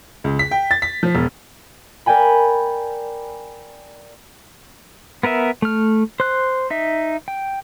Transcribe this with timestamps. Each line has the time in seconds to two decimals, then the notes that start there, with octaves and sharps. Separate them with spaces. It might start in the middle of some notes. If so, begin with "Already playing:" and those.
0.24 C#2
0.39 B6
0.51 G5
0.71 A6
0.82 B6
1.03 F3
1.15 E1
2.06 A#4 D5 G5 G#5 B5
5.23 B3 A#4 B4 E5
5.62 A3 F6
6.20 C5 F#6
6.70 D#4 E5
7.28 G5